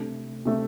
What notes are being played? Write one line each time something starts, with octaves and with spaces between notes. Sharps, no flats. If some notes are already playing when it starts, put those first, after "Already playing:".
Already playing: C3 A3 D4 A4
C3 A3 D4 A4